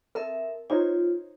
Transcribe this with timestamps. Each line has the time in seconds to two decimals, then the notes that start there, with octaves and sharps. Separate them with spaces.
0.15 C4 A4 A#4 E5
0.70 D#4 F4 C5 C#5